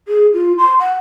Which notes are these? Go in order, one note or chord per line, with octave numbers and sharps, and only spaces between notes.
G#4
F4
C6
F#5